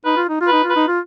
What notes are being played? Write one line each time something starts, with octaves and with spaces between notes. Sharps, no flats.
D#4 B4
F4
D#4
F4
D#4 B4
F4
B4
D#4
F4